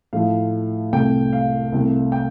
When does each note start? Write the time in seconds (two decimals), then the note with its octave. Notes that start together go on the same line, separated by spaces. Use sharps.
0.13 A2 F3 A3 F5
0.93 C2 C3 A3 G5
1.33 F5
1.72 C2 C3 A3
2.12 G5